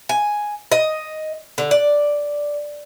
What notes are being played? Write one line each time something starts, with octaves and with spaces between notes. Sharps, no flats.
G#5
D#5
D3
D5